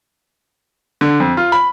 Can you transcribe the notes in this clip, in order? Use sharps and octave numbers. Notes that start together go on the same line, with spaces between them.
D3
F2
F4
B5